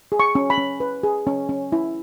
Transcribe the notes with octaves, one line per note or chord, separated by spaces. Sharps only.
G#4
C#6
C#4
B5
C#4
B4
G#4
C#4
C#4
E4